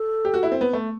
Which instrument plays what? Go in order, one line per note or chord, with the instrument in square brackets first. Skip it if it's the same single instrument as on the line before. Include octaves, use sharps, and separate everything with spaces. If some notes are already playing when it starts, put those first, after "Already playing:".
Already playing: [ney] A4
[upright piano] G4
F#4
E4
C4
B3
A3